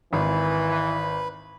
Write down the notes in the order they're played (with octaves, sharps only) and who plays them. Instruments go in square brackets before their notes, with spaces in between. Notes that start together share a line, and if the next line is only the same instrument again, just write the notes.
[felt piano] G#1 [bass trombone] E3 [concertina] B4 B5